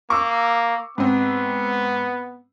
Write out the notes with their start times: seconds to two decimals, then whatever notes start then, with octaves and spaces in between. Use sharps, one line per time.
0.10 A#3 C#6 D6 E6
0.98 G#2 B3 C4